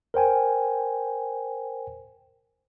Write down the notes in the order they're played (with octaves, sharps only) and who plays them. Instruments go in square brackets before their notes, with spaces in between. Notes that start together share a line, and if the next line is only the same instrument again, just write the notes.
[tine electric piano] A#4 C5 G5 G#5